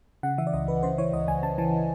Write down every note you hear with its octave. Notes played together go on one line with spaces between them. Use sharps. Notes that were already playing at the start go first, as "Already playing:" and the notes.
C#3 F#5
E3 E5
D5
C#2 D#5
C#2 B4
C#3 C5
E3 C#5
C#2 D#5
C#2 G#5
C#3 A5
E3 A5